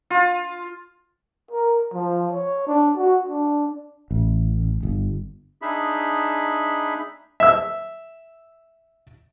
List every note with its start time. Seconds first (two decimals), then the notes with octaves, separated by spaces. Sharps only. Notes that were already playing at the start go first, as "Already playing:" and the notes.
0.10 F4
1.51 A#4
1.93 F3
2.32 C#5
2.67 D4
2.97 F#4
3.28 D4
4.11 A1
4.83 G1
5.62 D4 D#4 G#4 E5 B5
7.40 E5 E6